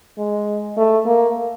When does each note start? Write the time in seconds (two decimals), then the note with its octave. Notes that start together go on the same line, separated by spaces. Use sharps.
0.18 G#3
0.77 A3
1.06 A#3